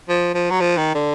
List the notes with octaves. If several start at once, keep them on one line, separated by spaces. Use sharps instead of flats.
F3
F3
F#3
F3
D#3
D3